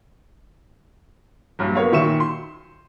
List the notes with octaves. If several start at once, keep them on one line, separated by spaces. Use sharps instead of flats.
A#1 G2 F#3
A#3 B3 C#5 F5
A#2 D#3 E5 C#6 C#7 E7
C6